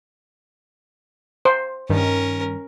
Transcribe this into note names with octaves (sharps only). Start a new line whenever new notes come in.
C5
G2 D#3 C#4 A#4